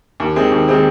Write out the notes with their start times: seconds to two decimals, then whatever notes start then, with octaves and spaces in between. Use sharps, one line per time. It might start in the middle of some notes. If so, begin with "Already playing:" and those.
0.20 D#2
0.36 D#3 G#3 C4 G#4
0.52 D#2
0.68 D#3 G#3 C4 G#4